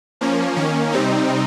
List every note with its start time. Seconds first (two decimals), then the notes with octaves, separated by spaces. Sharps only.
0.21 F3 A#3 C#4
0.56 D#3 A#3 C#4
0.92 C3 G3 C4 D#4